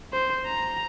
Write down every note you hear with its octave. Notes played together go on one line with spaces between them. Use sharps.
C5
A#5